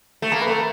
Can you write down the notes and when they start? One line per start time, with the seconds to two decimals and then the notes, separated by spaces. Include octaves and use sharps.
0.22 A3
0.32 A#3 A#4
0.41 B4
0.48 A3 A#4